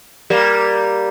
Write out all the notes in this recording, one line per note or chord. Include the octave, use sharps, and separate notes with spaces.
G3 A#3